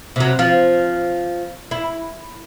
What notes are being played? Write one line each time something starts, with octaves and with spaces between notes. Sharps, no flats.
C3 F#3
F3
E4